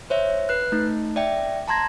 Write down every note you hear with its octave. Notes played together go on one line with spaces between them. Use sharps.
C5 C#5 E5
B4 F#6
A3 D#4
D5 E5 G5
A5 A#5 C6 G#6 A#6